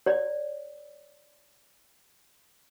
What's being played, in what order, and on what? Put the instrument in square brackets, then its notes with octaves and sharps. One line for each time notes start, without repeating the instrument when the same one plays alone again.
[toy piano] C#5 D5